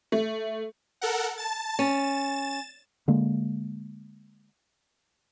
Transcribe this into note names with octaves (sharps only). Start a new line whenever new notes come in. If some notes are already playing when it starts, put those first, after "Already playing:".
A3
A4 A#4 F#5
A5 A6
C#4 A6 E7
D3 G#3 A#3